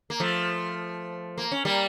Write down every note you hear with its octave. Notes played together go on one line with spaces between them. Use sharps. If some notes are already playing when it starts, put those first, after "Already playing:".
A#3
F3 A3
A#3
C#4
G3 A#3